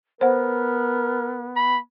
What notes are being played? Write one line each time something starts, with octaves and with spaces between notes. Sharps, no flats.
B3 A#4 C5 F#5
B5